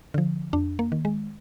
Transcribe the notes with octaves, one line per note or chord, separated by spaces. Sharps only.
D3 F3
F2 D4
A#3
D#3
G#3